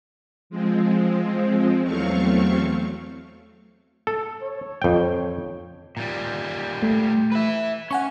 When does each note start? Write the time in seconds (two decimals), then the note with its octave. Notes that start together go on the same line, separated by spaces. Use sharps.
0.50 F3 G#3 C4
1.82 E2 F#3 A3 C4 F5 C#6
4.07 A4
4.43 C#5
4.82 F2 G5
5.97 A#2 G3
6.83 A3
7.32 B4 E5
7.91 C#4 F#5 G#5 C#6